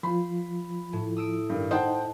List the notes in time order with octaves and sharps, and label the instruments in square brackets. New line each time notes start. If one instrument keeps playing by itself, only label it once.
[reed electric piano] F3 F4 [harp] C5 [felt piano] B5
[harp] A2
D#6 E6 D7
[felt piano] G2 D#3
[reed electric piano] D#4 D#5 [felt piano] C5 F#5 G5 [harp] A5